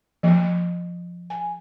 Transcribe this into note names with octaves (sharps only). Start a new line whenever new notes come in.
F3 A#3
G#5